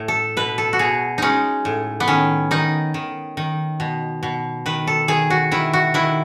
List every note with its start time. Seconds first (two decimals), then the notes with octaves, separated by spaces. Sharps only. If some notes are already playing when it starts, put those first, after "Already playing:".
Already playing: A2 A3
0.08 A4
0.37 B2 B4
0.58 A4
0.73 F#4
0.79 B2 G#4
1.18 G#3 C#4 D#4
1.65 A2
2.00 B3
2.08 D#3 C#4
2.51 D#3 D#4
2.94 D#3
3.37 D#3
3.80 B2
4.23 B2
4.66 D#3 B4
4.87 A4
5.08 D#3 G#4
5.30 F#4
5.51 D#3 E4
5.73 F#4
5.94 D#3 E4